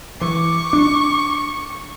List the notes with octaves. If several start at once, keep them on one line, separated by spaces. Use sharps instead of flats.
E3 C#6 D6
D4